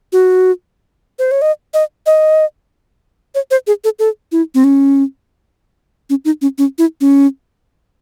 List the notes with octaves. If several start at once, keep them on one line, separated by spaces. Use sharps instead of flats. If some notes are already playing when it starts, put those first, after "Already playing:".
F#4
C5
C#5
D#5
D#5
D#5
C#5
C5
G#4
A4
A4
E4
C4
C#4
C#4
D#4
C#4
C#4
E4
C#4